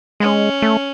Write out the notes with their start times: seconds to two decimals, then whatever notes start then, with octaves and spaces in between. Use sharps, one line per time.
0.20 G#3 C#4
0.62 A3